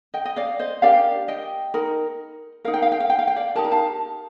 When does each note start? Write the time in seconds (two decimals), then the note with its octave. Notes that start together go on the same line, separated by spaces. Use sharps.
0.14 D#5 G5
0.25 D#5
0.36 D5 F5
0.59 C5 D#5
0.82 D4 G4 A#4 D5 F5
1.28 D#5 G5
1.74 D#4 A#4
2.64 D#4 A#4 F5
2.74 G5
2.82 F5
2.92 G5
3.00 F5
3.10 G5
3.19 F5
3.27 G5
3.36 D5 F5
3.55 D#4 G4 A#4 A5
3.64 A#5
3.71 F5 A5